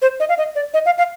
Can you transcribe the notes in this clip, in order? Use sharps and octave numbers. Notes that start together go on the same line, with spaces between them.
C5
D#5
F5
D#5
D5
D#5
F5
F5